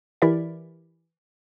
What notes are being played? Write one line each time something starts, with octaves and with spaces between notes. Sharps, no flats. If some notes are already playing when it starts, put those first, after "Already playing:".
E3 E4 G4 A#4 D5 E5